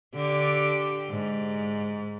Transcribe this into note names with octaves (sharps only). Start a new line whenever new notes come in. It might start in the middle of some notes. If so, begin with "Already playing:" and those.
D3 G4
G#2